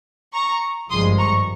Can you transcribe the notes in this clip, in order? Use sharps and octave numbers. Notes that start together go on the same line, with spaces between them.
A#5 C#6
G#1 G2 F3 G#3 C6 D#6
A#5 C#6